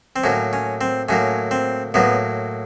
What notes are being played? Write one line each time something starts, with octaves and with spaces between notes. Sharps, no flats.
C4
A2 F#3 A#3 C#4
C#4
C4
A2 F#3 A#3 C#4
C4
A2 F#3 A#3 B3